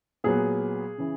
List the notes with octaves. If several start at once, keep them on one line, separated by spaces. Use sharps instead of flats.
A#2 F#3 B3 G#4
C#3 E3